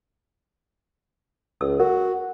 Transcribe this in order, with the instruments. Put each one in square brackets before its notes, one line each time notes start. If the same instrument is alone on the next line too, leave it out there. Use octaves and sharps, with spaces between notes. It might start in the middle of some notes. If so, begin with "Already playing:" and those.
[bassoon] C#2 [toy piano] E6
[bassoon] F#4 [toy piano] A#4